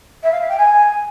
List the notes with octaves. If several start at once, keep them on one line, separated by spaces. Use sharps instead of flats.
E5
F5
E5
G5
G#5